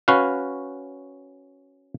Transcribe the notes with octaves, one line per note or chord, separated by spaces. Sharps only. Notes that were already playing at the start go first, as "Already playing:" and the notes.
C#4 F#4 B4 F5